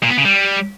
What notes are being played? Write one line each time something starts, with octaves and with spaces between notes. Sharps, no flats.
A#2
B3
C#3
G3